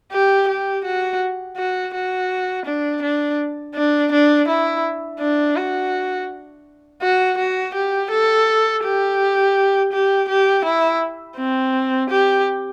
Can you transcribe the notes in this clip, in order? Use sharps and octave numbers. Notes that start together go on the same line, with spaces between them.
G4
G4
F#4
F#4
F#4
D4
D4
D4
D4
E4
D4
F#4
F#4
F#4
G4
A4
G4
G4
G4
E4
C4
G4